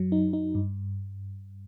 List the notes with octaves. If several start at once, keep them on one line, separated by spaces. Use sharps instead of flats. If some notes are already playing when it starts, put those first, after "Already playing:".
Already playing: F#2 F#3
D#4
D#4
G2